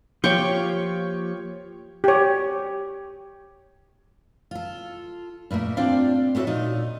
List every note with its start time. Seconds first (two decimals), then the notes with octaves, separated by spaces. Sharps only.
0.24 F3 A#3 F4 G4 C#5 G5 C#6
2.04 G4 C#5
4.51 F4 A4
5.51 G2 A#2 A3 A#3
5.77 C4 D4 F4 A4 D5 F5
6.35 A3 B3 F#4 A4 C#5 E5
6.47 A#2 D#4